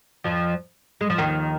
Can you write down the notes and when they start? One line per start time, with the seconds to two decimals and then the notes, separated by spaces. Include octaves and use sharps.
0.24 F2 F3
1.01 G#3
1.10 F3
1.18 D#2 D#3